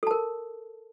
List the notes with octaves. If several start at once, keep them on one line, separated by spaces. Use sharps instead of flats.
A4 A#4 A5